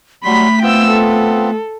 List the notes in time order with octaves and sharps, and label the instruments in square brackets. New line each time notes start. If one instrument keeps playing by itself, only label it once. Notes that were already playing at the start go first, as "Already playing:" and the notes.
[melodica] F#3 G3 C6 [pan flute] A3 [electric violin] B5 B6
[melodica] B3 C4 F4 [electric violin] G5 E6
[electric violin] A4